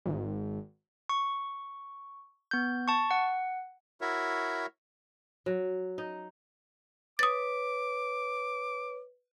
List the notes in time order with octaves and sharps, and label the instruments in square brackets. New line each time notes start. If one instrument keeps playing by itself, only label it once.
[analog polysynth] G#1
[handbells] C#6
B3 G6
A5 C#6
F#5
[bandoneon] E4 F#4 A#4 C#5 E5
[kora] F#3
D#4
[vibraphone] B4 C#5 [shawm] D6 [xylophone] D#6 A6